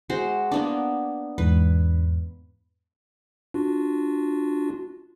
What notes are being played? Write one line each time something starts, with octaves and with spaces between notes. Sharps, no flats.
G#3 F#4 C5
A#3 B3 D4
E2 G#2 B4
D4 F4 F#4